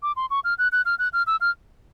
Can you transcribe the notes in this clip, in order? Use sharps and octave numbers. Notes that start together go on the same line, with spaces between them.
D6
C6
C#6
F6
F#6
F#6
F6
F#6
F6
E6
F6